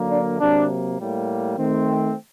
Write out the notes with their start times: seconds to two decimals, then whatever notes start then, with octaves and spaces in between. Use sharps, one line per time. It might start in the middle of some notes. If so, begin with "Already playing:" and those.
Already playing: D3 F#3 A#3
0.10 D4
0.39 C3 F#3 A#3 D4
0.98 A2 G3 A#3
1.57 D#3 A3 C4